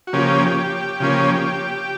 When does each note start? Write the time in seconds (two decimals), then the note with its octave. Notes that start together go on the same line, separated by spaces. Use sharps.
0.07 F#4
0.13 C#3 F3 A#3 C#4 G4
1.00 C#3 F3 A#3 C#4